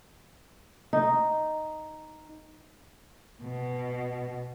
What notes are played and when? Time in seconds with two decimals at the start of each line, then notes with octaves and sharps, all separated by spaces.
0.93 D#4
3.41 B2